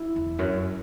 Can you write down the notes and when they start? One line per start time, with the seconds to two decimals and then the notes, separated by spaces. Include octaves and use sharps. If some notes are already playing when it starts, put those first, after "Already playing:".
Already playing: E4
0.16 E2
0.39 F#2